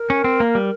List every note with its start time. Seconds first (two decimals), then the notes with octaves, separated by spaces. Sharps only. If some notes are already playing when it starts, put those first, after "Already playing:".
Already playing: A#4
0.10 C#4
0.24 C4
0.40 A#3
0.55 G3